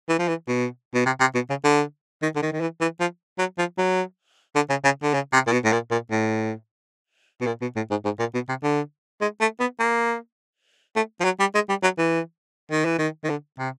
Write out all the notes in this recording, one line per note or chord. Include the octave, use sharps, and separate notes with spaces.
E3
F3
E3
B2
B2
C3
C3
B2
C#3
D3
D#3
D3
D#3
D#3
E3
E3
F3
F#3
F3
F#3
D3
C#3
C#3
D3
C#3
C3
A#2
B2
A2
A#2
A#2
A2
B2
A#2
B2
A2
G#2
G#2
A#2
B2
C3
D3
G#3
A3
B3
A#3
A3
F3
F#3
G3
G#3
G3
F#3
E3
D#3
E3
D#3
D#3
D3
C3